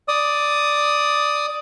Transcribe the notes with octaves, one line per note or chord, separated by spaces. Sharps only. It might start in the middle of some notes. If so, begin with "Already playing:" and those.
D5 D#6